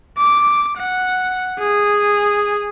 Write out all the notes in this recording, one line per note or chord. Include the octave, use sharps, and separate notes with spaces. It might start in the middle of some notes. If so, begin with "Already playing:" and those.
D6
F#5
G#4